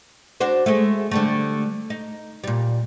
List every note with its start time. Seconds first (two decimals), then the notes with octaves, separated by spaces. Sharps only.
0.40 D4 F#4 C5
0.66 G#3 A3
1.11 D3 G3 A3
1.90 D#4
2.44 A#2 G3